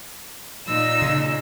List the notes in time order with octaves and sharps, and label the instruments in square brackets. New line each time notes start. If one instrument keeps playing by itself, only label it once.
[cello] A#2 D#4 [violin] E6
[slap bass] C#3